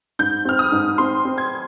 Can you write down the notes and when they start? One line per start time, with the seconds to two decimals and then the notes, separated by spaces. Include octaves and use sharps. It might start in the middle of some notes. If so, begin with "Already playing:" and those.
0.19 G#2 G6
0.45 C4 F6
0.59 D#6
0.72 G#2
0.98 C4 C6
1.25 C4
1.38 G#6